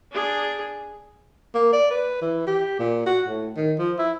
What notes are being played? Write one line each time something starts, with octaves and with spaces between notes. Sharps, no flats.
D4 G#4
A#3
D5
B4
E3
G4
A#2
F#4
A2
D#3
F3
E4